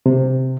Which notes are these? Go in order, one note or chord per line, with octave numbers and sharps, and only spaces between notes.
C3